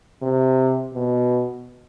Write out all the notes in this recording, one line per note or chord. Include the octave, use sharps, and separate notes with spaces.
C3
B2